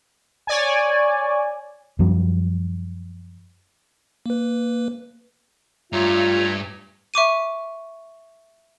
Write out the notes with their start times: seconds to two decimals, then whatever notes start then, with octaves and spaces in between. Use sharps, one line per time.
0.47 C#5 D5 G#5
1.99 F#2 F3 G3
4.26 A#3 B4
5.93 G2 A3 F4 C#5 A#5
7.14 E5 C#6 D6 D#7